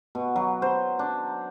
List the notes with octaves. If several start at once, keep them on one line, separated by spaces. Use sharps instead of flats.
B2
F#3
C5
D4